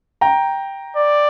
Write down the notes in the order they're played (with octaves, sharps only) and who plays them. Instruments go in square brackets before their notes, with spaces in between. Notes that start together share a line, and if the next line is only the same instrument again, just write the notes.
[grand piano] G5 A#5
[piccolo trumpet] D5